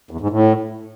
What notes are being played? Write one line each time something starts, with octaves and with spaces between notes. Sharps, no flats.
E2
G#2
A2